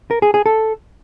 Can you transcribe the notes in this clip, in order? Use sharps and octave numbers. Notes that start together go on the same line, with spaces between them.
A#4
G#4
G#4
A4